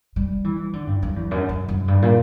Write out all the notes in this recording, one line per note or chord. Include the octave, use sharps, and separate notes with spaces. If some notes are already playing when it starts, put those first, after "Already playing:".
G3
E3
D3
G2
F#2
E2
F#2
F#2
F#2
G2
A#2